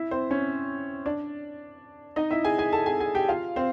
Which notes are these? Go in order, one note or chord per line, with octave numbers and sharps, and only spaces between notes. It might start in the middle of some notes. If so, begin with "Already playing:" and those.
Already playing: E4 E5
C4 C5
C#4 C#5
D4 D5
D#4 D#5
E4 E5
G#4 G#5
G#4 G#5
A4 A5
G#4 G#5
G#4 G#5
G4 G5
F4 F5
C4 C5